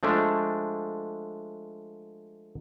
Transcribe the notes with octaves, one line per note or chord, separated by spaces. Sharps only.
F3 G#3 A3 D4